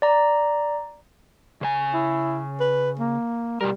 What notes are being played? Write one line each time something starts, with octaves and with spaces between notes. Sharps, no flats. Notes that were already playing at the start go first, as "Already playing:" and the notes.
D5 A#5
C#3 C5 G#5
E4
B4
A#3
B2 G3 A#4